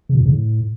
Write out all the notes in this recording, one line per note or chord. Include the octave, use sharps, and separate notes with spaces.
C#3
B2
G2
C#3
A2